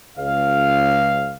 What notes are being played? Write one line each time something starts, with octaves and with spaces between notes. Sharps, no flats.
C#2 F5